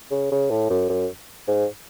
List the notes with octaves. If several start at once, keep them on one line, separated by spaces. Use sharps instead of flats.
C#3
C#3
A2
F#2
F#2
G#2